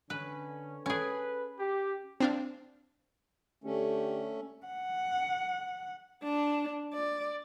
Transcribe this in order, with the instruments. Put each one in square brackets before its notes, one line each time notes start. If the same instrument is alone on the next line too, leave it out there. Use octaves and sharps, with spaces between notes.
[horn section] D3 C#4 [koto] B4
[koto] C#4 G#4 [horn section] A4 B4
[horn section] G4
[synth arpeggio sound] C4 D4 F5
[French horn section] D3 G4 [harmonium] A3 C#4
[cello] F#5
[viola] D4
D5